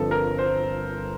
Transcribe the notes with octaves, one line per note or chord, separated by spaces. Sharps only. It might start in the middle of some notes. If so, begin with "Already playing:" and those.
Already playing: G1 G2 F3 C4 A4
A#4
C5